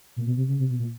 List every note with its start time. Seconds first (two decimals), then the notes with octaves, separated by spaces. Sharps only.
0.16 A#2
0.26 B2
0.37 C3
0.48 C#3
0.59 C3
0.69 B2
0.79 A#2